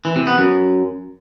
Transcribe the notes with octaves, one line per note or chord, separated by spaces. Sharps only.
E3
C3
B3
F#2